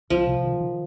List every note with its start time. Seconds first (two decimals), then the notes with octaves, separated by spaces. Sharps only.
0.10 C2 F3
0.27 C3
0.44 D#3
0.61 D#3